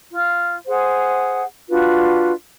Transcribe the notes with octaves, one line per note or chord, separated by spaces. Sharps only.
F4
G#4 C5 F#5
D4 F4 F#4 B4